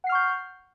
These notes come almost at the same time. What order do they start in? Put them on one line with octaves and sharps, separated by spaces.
F#5 C7 F6 C#6 G6